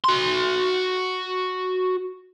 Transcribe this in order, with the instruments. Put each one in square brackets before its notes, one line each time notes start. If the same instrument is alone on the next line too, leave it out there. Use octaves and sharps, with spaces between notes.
[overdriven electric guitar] F#4 C6